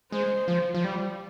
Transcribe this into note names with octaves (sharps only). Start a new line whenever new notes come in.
G#3 C5
F3
F3
G3